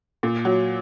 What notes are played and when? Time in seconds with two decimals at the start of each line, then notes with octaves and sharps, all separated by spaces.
0.23 A#2
0.45 F#3